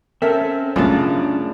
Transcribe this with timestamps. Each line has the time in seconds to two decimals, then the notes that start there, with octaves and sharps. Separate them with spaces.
0.22 C4 C#4 A4 A#4 E5
0.76 F#2 C#3 A3 C#4 D4 F4 G#4 A5